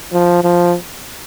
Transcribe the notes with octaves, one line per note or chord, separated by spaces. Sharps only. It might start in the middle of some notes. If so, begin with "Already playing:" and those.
F3
F3